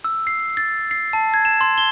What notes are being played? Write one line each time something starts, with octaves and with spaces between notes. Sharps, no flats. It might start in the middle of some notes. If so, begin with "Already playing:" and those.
E6
C7
A6
C7
A5
G#6
E7
C6
G7